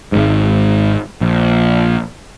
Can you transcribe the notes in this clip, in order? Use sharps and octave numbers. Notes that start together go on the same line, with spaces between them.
G#1 G#2
A#1